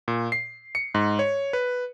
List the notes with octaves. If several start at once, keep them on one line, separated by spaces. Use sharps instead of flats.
A#2
C7
C#7
G#2
C#5
B4